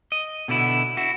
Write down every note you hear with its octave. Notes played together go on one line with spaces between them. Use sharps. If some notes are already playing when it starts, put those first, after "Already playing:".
D#5
B2 D3 B3 E4
E4 F#4